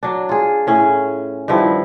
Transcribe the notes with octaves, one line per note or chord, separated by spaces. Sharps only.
F#3 D4
F4 G#4
A2 C#4 G#4
G2 D#3 F3 E4